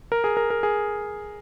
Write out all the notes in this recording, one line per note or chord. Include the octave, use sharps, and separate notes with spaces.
A#4
G#4
A#4
A#4
G#4